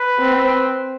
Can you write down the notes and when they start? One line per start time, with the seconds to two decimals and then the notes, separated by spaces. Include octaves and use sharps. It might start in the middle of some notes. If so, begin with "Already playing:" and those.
Already playing: B4
0.20 C4